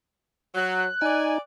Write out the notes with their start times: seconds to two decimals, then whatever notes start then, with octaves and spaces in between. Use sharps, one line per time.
0.55 F#3 F#6
1.02 D#4 D5 G#5